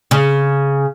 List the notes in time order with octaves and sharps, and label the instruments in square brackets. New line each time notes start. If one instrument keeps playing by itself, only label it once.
[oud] C#3